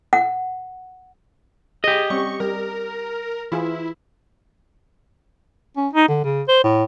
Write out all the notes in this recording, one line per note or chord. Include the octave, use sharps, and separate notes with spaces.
F#5
G4 G#4 D#5
G3 C4 C#4 C#6
G3 A#4
E3 E4 F4 G#4
C#4
D#4
D3
C#3
C5
A2